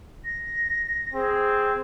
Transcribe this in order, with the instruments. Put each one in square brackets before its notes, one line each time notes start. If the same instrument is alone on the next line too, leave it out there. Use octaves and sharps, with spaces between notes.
[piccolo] A#6
[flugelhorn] C4 [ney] G#4